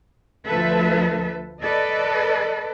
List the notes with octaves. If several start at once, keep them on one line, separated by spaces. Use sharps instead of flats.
D2 F3 A4 B4 E5
A4 B4 D5 D#5